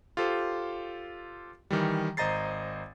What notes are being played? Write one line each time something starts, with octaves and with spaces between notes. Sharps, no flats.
F4 G4 A4 C5
D#3 E3 G3
G#1 C5 D#5 A#5 A6 C7